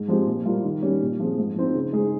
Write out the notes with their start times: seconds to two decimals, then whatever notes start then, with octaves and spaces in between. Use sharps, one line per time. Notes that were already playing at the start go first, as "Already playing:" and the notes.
Already playing: G#2
0.08 F3 G#3 C4 G4
0.27 A#2
0.45 G3 A#3 F4
0.64 D#3
0.82 G3 C#4 G4
1.02 A#2
1.20 F3 C4 F4 G#4
1.38 G#2
1.56 F3 C4 D#4
1.75 C#3
1.93 G#3 D#4 G#4